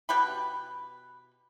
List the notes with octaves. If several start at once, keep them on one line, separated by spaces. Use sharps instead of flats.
B2 G4 B4 B5